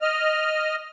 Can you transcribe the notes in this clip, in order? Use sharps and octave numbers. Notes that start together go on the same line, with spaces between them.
D#5 F6